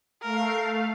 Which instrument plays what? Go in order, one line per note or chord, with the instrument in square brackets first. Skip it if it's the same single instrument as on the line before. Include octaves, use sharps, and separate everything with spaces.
[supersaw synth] A3 F5 [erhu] A#4